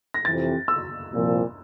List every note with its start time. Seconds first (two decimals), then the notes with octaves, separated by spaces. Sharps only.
0.14 A#6
0.25 F2 C3 E3 A6
0.68 E6
1.11 C2 A#2 F3